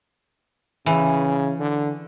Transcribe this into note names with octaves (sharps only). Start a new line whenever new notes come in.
C#3 E3
D3